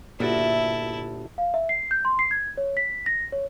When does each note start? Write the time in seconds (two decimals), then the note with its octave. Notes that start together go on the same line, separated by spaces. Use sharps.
0.20 G1 A#2 E4 F#4 D5 E5 A5
1.38 F5
1.54 E5
1.69 C7
1.91 G6
2.05 C6
2.19 C7
2.31 G#6
2.57 C#5
2.77 B6
3.06 A#6
3.32 C#5